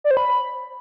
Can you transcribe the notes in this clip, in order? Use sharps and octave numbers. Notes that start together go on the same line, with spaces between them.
D5
C5
B5